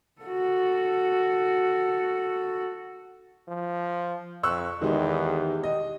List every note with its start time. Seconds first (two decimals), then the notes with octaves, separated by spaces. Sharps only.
0.22 F#4 A4
3.48 F3
4.43 F2 C#6 E6 F#6
4.82 E2 D#3 G#3 D#4 G4
5.64 D#5